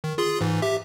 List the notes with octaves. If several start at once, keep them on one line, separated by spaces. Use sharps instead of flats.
D#3
F4 G#4 C6
G#2 E3
G4 E5